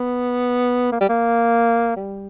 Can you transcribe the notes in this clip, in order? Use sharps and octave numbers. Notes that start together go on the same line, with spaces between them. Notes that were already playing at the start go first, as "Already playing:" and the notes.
Already playing: B3
A#3
G3
A#3
G3